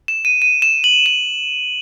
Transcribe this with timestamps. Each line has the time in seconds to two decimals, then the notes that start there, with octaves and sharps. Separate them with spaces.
0.08 E7
0.25 D#7
0.42 D#7
0.62 E7
0.84 F#7
1.06 E7